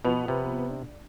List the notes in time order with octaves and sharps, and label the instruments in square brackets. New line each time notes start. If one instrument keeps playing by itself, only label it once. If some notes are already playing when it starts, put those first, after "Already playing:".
[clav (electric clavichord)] B2 [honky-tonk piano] F3 B3 F7
[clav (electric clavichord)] C3
[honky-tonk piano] D4